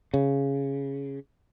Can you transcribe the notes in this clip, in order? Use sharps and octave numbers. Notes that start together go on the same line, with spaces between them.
C#3